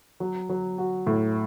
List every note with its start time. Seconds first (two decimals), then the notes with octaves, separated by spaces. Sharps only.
0.20 F#3
0.49 F#3
0.78 F#4
1.07 A2